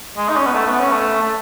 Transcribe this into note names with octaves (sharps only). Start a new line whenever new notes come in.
G#3
D#4
C#4
B3
A3
B3
C#4
A3
A3